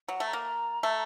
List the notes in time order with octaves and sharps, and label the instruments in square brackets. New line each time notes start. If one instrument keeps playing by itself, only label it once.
[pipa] F#3 [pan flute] F#5
[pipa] A3
[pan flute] A#5
[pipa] A#3
A3